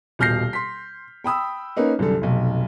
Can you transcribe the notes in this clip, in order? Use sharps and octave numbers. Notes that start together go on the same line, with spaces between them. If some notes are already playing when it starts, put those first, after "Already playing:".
D#1 B2 F6 G6 A#6 C7
C6 B6
G5 B5 D#6 E6
A#3 C#4 D#4 B4
C2 F#2 D3 A4
F1 B1